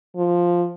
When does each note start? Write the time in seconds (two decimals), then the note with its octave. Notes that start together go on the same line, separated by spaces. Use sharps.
0.17 F3